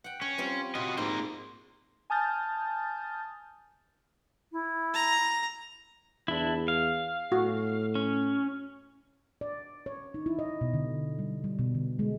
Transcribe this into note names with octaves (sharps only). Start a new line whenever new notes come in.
F#5 G5
C#4 C#5
G3 C4 F4
F4 F#4 D#5
G#2 A#3 C5
G#5 A5 D#6 F6 G6 A6
E4
A#5
E2 D4 E4
F5
A2 F#4
C#4
D5
C#5
D#4
E4
D#5
B2
D3
G3
G3
B2
D3
G#3